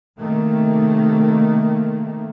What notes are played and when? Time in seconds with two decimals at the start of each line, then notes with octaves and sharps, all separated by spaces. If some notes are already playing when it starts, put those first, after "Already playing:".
0.16 C3 D#3 A3 A#3